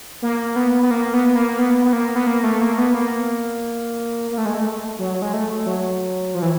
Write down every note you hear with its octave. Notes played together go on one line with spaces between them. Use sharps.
A#3
B3
B3
A#3
B3
A#3
B3
B3
A#3
B3
A#3
A3
A#3
B3
A#3
A#3
A3
G#3
A3
F#3
G#3
A3
F#3
F3
E3